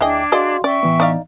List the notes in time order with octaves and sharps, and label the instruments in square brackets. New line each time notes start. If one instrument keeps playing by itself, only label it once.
[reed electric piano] D2 G5 [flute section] D4 D6 G#6 [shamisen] E4 G#4 D#5
[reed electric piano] F#4 F5 C6 [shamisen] G#4 D5 D#5
[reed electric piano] C#4 [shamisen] D5 [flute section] E5 G5 C#6
[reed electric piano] A2 E3 B3
[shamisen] D#4 D5 F5